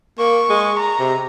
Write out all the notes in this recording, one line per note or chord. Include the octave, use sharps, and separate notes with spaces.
A#3 C#6
G#3
A#5
C3